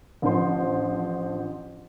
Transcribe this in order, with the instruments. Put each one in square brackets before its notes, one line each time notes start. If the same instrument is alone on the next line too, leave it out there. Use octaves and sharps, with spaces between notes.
[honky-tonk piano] A1 D3 F3 C5 C6